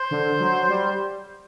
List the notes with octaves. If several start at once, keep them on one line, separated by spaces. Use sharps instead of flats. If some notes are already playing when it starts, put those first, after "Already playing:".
Already playing: C5
D3
F#3
G3